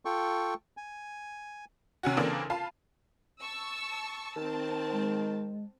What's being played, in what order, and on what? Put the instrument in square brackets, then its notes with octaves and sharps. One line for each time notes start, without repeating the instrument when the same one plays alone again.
[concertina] F4 A4 G5 C#6
G#5
[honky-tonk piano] C3 C#4 F#4
C#3 E3 A#3 C4 D4 A4
F4 F5 A5 B5
[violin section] A5 C#6 E6
[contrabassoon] D#3 [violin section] C4 A5
[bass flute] G#3